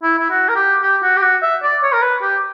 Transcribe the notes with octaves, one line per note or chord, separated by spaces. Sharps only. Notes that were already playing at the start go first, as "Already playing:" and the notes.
E4
E4
F#4
A#4
G4
G4
F#4
G4
F#4
E5
D5
C#5
A#4
B4
G4